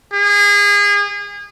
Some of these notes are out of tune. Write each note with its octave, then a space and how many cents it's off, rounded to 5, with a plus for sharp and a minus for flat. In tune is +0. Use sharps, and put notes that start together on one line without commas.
G#4 -30